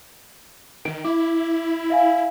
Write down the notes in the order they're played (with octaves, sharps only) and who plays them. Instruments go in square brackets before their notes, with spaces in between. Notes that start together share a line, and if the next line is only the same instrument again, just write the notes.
[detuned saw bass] D#3 [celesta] D7
[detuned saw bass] E4 [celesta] D6
[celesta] E5 F5 G#5